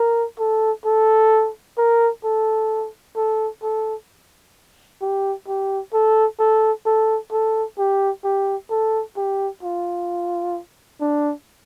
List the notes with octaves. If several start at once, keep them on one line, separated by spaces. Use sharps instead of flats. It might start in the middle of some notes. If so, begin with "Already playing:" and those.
Already playing: A#4
A4
A4
A#4
A4
A4
A4
G4
G4
A4
A4
A4
A4
G4
G4
A4
G4
F4
D4